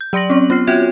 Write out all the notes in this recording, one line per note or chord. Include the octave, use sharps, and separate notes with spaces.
G6
F#3 D5 C6 A#6 F#7
C4 C#4
B3 F4 F6 C7
F4 F#4 C#5 E5 G#6